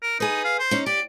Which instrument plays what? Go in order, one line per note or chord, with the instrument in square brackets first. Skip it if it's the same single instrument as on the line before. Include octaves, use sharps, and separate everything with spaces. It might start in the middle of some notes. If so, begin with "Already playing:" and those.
[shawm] A#4
[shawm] D#4 [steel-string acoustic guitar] G#4 B4
[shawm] F5
C5
[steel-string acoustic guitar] C#4 D#4
[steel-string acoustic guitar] G4 [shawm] D5